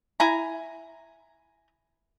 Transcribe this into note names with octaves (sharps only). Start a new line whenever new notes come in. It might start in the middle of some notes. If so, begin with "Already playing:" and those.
E4 G#5 A#5